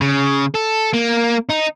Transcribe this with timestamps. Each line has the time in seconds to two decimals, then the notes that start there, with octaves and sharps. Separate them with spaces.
0.01 C#3
0.55 A4
0.93 A#3
1.50 D#4